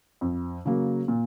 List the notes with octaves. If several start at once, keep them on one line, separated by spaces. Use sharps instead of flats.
F2
C#3 F#3 A#3
A#2